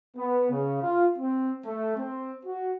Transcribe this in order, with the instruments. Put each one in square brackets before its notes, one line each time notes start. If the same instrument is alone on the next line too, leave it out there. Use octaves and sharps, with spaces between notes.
[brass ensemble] B3
C#3
F4
C4
A3
C4
F#4